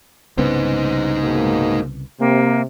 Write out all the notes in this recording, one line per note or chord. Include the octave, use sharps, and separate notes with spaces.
C2 C#3 B3 D#4 C5
B2 G#3 A#3
C3 A#3